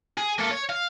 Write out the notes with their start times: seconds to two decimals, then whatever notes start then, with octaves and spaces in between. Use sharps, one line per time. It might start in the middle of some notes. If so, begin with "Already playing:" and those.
0.17 G#4
0.38 A#3 A4
0.51 C#5
0.69 F5